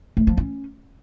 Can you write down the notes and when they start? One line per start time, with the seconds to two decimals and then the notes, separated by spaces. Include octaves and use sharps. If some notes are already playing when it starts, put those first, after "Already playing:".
0.17 A3
0.27 F3
0.37 C#4